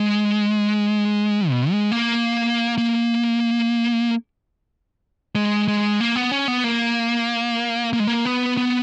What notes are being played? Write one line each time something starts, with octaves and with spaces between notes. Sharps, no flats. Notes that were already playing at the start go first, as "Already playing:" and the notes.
Already playing: G#3
B2
G#3
A#3
A#3
G#3
G#3
A#3
B3
C#4
B3
A#3
A#3
G#3
A#3
B3
B3